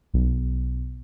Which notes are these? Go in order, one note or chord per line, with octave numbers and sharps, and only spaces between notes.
B1